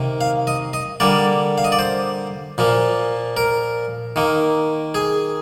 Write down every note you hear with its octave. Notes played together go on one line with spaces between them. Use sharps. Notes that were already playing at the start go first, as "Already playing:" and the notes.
Already playing: C3 D#3 A#3
F5
D#5
D#5
D3 G3 A#3 D5
F5
D#5
D5
C5
A#2 F3 A#3
A#4
D#3 A#3
G#4